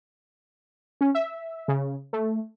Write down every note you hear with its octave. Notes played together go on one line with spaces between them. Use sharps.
C#4
E5
C#3
A3